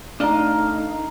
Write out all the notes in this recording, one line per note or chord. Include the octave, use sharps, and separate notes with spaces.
A3 D4 D#4 D#5 F5 A#5